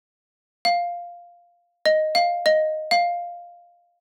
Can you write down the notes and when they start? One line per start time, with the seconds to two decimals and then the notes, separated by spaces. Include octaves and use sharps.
0.65 F5
1.86 D#5
2.15 F5
2.46 D#5
2.91 F5